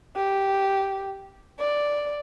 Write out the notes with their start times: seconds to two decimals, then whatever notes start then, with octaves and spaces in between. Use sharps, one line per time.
0.16 G4
1.59 D5